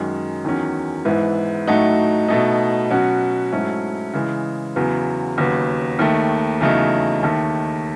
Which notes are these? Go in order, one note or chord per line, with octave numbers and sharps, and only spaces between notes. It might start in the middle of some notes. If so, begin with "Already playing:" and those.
Already playing: F#2 D#3 G#3 C#4
E2 D#3 F#3 C#4
G#2 E3 B3 E4
A2 F#3 A3 D#4 F#4
B2 A3 D#4
B2 F#3 C#4 F#4
G#2 F#3 A3 C#4 E4
C#3 E3 G#3
E2 C#3 F#3 B3
D#2 C#3 F#3 B3
D#2 D#3 A3
E2 C#3 F#3 A3 D#4
D#2 D#3 A3